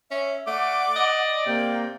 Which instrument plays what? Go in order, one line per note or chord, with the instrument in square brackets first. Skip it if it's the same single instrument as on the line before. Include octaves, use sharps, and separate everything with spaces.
[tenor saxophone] C#4 [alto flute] E5
[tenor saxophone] A3 [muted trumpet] D5 [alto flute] F#5 [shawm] D6
[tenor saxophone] D#5
[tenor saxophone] C3 [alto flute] A#3 [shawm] G5